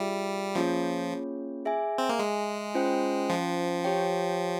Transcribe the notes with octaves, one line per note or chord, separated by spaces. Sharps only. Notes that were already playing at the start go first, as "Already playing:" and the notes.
Already playing: G3 F4 G#4 E5
F3 A#3 C#4 F4 G#4 C#5
G#4 E5 G#5
C4
A#3
G#3
C#4 F4 C5 G5
F3
G4 C#5 G5